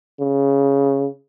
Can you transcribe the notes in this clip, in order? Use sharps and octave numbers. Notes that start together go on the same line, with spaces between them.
C#3